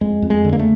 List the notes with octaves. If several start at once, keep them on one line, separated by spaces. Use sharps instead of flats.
F2 G#3
F2
G#3
D3
A#3
A3